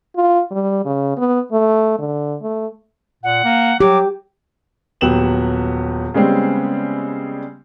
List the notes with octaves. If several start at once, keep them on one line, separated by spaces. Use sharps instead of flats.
F4
G3
C#3
B3
A3
D3
A3
A#2 F#5
A#3
F#3 G4 D6
D#1 F#3 B3 G4 E7 F#7
C#3 G3 G#3 B3 C4